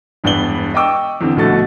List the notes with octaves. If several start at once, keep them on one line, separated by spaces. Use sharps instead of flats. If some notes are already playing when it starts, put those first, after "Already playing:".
E1 G2 B3 D5 F#7 G7
D#5 G5 C#6 D6 E6
E2 D3 C4
A#1 B2 D3 A3 F#4 A6